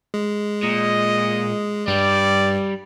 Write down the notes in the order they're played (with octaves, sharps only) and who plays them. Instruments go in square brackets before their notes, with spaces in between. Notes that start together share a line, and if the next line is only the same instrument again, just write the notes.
[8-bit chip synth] G#3
[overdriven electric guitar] A#2 [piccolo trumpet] D#5
[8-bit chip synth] G2 [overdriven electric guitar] G3 [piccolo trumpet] D5